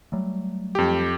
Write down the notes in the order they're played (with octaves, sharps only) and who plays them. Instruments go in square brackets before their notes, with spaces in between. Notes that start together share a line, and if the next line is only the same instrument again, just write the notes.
[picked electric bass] F#3 G3 A3
[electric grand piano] F2 G4